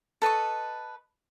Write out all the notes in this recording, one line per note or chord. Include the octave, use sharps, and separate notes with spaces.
A4 B4 D#5 C#6